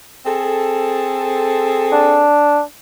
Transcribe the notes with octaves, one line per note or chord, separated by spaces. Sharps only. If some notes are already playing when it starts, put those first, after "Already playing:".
C4 G#4 A4
D4